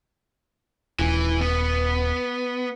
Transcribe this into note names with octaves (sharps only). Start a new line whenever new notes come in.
D#1 E3
B3